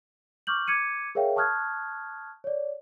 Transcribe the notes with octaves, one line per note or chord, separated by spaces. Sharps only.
C#6 D6 F6 G6 F#7
D6 G#6 C#7 D#7
G#4 A#4 C#5 E5 F5 G5
A5 C#6 D#6 F6 F#6 G#6
C#5 D5